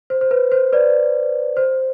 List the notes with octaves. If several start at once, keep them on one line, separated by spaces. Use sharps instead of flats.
C5
C5
B4
C5
B4 D5
C5